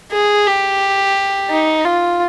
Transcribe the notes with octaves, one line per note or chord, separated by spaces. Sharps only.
G#4
G4
D#4
F4